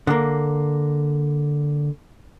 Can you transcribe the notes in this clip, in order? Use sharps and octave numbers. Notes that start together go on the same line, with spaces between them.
D3 A#3